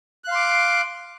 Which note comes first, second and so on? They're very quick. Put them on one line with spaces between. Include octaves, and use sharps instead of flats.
F#6 F5 C6 D6